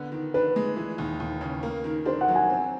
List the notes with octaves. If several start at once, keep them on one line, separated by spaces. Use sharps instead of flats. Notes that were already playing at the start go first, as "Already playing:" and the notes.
Already playing: D3 B3
D#3
D4 B4
G#3
E3
D#2
D#2
C#3
A#3
D#3
D4 C5
F#5
F#3
G#5
C4